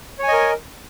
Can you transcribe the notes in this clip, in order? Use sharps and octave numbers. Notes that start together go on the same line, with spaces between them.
A#4 C#5 D#5 G#5